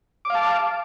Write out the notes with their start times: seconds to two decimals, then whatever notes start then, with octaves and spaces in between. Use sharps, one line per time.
0.25 D6
0.30 F5
0.35 A5